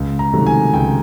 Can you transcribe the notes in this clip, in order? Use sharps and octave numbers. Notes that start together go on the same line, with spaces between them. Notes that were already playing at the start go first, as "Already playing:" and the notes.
Already playing: C#2
A#5
C3 D#3 F#3 A3
G#5
C#2 G5